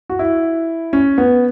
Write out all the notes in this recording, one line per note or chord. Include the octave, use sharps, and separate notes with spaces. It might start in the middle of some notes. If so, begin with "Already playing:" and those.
F#4
E4
C#4
B3